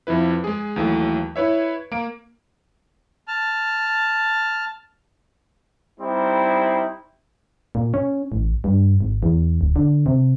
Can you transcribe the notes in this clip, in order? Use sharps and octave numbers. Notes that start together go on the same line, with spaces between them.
F2 F3 E4 B4
G#3 G#4
D#2 E3 F#3 A3
E4 B4 C#5 E5
A#3 D7
A5 F6
G3 C4 D#4 E4
A#2
C#4
A1
G2
G#1
E2
D1
D3
C3